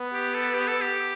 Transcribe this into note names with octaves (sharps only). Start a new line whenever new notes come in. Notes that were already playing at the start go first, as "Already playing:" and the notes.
Already playing: B3
G4
A4
G4
A4
G4